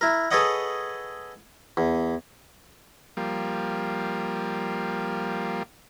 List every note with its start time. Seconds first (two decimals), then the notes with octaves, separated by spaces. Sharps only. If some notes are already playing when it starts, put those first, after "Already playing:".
0.01 E4 A#4
0.31 G#4 A4 B4 C#5 D#5 F#5
1.77 E2
3.17 F3 G3 A#3